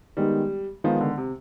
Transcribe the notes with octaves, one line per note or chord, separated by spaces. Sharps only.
D#3 G3 G#3 B3 D#4
D#3 F3 G#3 B3 D#4
D3
C3